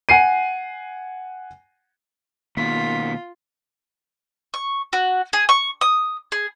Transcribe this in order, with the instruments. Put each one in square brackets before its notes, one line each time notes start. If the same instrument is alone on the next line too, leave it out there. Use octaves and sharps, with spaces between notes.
[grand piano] F#5 G#5 C7 D#7
[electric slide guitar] B2 D#3 [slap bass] A#3 [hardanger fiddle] F4 [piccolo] B6
[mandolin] C#6
F#4
G#4
C#6
D#6
G#4